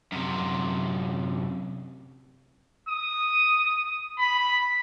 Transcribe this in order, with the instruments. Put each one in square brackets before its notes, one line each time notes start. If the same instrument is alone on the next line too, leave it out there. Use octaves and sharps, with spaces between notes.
[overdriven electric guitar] F#2 C3
[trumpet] D#6
B5